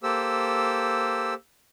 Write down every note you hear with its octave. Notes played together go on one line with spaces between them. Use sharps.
A#3 G4 A4 C5 E6